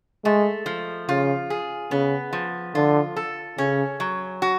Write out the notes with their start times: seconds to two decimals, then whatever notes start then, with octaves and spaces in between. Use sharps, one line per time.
0.24 G#3 A3
0.66 F3
1.09 C#3 F4
1.50 G#4
1.91 C#3 B3
2.33 F3
2.75 D3 F4
3.16 A4
3.58 C#3 C#4
4.00 F#3
4.42 F#4